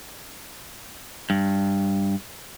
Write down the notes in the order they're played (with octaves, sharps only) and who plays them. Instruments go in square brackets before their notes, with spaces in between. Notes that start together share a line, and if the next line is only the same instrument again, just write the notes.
[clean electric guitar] G2